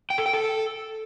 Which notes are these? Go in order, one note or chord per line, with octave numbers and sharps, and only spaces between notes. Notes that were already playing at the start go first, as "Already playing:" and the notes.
G5
A4
G5
A4